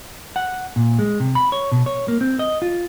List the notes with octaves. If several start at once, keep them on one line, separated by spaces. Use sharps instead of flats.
F#5
A#2
G#3
C3
B5
C#5
B2
C#5
A#3
C4
D#5
F4